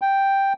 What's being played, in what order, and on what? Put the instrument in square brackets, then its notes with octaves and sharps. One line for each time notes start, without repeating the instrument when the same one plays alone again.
[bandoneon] G5